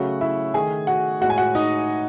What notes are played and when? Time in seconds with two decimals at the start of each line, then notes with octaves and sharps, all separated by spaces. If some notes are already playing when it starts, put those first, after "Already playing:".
Already playing: C#3 F#3 A3 F#4 F#5
0.21 E4 E5
0.54 D#3 A3 G#4 G#5
0.87 F#4 F#5
1.21 A2 G#3 F#4 F#5
1.30 G#5
1.38 F#4 F#5
1.55 D#4 D#5